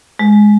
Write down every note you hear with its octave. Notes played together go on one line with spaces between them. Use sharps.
G#3